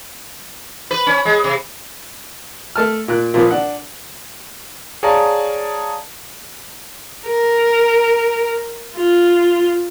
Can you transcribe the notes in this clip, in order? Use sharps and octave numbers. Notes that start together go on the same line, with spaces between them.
B4
C#4
G#3
C3
A3 A5 F6
A#2 F#6
A#2 F3 B3
D4 F#5
G#4 C#5 D5 F5 A5 A#5
A#4
F4